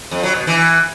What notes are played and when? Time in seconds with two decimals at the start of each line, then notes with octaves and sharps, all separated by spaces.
0.11 F2
0.23 F#3
0.35 B2
0.47 E3